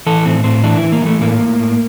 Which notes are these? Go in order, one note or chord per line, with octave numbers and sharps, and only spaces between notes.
E3 A4
A2 C4
A2 C4
E3 D4
E4
E3
A#3
E3 A3
A2 A#3
A2
A2